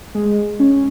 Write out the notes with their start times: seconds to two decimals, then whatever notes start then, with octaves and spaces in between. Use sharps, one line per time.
0.15 G#3
0.60 C#4